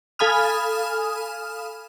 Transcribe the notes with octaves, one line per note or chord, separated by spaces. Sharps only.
A4 F5 G#5 B5 D#6 F6